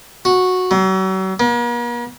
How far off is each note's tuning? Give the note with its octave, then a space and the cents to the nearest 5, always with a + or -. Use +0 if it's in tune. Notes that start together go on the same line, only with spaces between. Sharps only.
F#4 -10
F#3 +40
A#3 +45